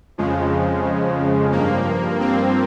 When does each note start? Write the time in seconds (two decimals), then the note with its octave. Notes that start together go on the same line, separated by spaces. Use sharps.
0.18 F2 C#3 F3 G#3
1.52 G2 F3 A#3
2.20 C4